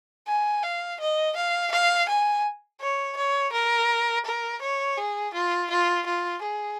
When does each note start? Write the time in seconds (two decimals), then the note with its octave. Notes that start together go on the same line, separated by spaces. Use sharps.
0.27 G#5
0.63 F5
1.00 D#5
1.36 F5
1.72 F5
2.09 G#5
2.81 C#5
3.17 C#5
3.53 A#4
4.25 A#4
4.62 C#5
4.97 G#4
5.34 F4
5.70 F4
6.06 F4
6.42 G#4